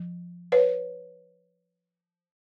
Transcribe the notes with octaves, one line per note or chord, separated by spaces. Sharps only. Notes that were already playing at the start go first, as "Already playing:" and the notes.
Already playing: F3
B4 C#5